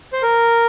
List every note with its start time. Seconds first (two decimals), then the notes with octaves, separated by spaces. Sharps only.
0.12 C5
0.22 A#4